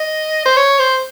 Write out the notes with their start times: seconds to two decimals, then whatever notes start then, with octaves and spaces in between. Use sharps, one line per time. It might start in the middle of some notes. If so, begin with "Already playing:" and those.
Already playing: D#5
0.46 C5
0.57 C#5
0.79 C5